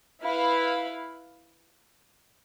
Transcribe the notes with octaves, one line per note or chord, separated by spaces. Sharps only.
E4 B4 F5